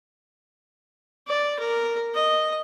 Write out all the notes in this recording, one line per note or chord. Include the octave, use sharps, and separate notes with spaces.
D5
A#4
D#5